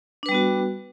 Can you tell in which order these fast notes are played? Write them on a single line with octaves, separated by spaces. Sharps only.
D4 B4 G3 B3 F#4